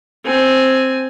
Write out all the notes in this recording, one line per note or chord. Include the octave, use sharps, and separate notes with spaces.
C4 G#5